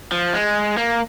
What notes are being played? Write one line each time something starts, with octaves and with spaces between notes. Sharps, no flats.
F3
G#3
A#3